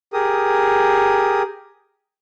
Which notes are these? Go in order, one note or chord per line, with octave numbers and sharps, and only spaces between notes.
G4 G#4 A#4 D#6